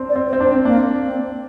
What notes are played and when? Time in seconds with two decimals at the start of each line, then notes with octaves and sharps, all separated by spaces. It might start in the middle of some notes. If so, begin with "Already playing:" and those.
Already playing: C4 D4
0.09 D5
0.16 C4
0.28 C5
0.33 C4
0.40 D4
0.48 C4
0.65 A#3 D4
1.03 C4